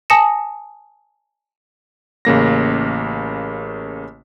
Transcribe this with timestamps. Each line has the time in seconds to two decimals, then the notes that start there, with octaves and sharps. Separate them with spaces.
0.10 G#5 A5 D#6 A#6 C#7 E7
2.25 A1 C#3 A#3 A#6